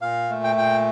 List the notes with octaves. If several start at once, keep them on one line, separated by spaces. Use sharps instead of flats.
A#2 F5
A3
G5
A#2 G5